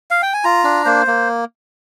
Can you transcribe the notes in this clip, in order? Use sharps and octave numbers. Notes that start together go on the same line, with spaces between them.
F5
G5
G#5
F4 A#5
D4
A#3 C5
A#3